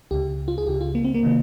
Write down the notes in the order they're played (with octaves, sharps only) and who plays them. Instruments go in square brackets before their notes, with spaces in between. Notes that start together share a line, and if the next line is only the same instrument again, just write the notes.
[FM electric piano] C#2 C#3 G4
F4
G#4
C#2 C#3 G4
F4
A#3
C4
A#3
C3 D#3